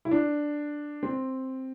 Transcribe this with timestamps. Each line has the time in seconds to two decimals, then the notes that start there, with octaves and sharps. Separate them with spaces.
0.05 E4
0.11 D4
1.03 C4